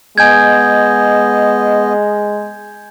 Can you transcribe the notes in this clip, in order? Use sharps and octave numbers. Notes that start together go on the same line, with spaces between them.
G#3 B3 D#5 G#5 G6 G#6